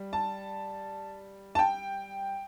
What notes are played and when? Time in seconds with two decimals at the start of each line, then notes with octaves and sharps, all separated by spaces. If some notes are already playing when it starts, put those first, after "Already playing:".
Already playing: G3
0.13 A5
1.55 A5
1.59 G5